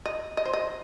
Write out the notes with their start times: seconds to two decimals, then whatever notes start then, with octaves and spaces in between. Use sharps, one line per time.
0.06 D#5
0.37 D#5
0.45 C5
0.53 D#5